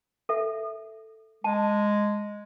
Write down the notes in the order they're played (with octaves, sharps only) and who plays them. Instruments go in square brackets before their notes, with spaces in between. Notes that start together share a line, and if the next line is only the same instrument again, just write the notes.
[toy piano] A4 E5
[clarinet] G#3 [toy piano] A5